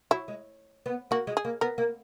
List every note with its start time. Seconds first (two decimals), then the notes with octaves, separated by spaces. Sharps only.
0.11 F#3 E4
0.28 G#3
0.86 B3
1.11 A#3 F#4
1.27 G#3
1.37 G#4
1.45 A#3
1.61 B3 A#4
1.78 A#3